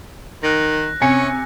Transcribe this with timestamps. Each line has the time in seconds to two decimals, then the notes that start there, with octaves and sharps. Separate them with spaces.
0.43 D#3 F#6 A#6
1.01 C3 C#4 G#5 C#7